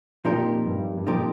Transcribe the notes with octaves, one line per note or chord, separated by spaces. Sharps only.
F2 A#2 F3 D#4 G4 A#4
G2
G2
F2 A#2 F3 D#4 G4 A#4